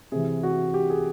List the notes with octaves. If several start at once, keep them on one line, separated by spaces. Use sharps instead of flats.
C3 E3 G#4
F#4
G4
G#4